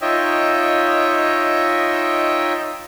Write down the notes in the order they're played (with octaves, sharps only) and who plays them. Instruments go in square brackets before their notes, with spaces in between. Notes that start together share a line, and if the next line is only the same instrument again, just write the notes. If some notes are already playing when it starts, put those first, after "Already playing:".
[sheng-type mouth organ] D#4 F4 C#5 D#5 E5 G5